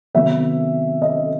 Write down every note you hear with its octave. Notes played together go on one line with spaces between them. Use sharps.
C3 D#3 F#3 B3 E5
D#5